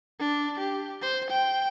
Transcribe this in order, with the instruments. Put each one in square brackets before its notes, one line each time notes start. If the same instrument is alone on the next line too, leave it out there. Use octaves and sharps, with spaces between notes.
[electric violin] D4
G4
C5
G5